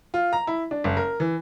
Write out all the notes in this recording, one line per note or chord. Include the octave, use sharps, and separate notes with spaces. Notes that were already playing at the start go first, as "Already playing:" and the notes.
F4
A#5
E4
D4
F#1
A#4
E3